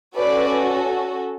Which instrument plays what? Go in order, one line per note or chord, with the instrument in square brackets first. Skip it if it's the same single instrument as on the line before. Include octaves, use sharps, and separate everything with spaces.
[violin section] C#4 F#4 A4 B4 D5